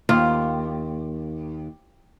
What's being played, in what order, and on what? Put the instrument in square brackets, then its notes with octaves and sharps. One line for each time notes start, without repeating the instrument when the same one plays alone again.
[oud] D#2 [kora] F4